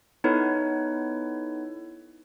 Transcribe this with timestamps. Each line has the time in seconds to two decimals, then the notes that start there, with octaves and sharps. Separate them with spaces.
0.24 B3 D#4 E4 A4 B4 C#5